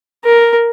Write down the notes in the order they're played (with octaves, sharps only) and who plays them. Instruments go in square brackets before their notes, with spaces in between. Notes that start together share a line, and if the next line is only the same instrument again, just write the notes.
[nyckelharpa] A#4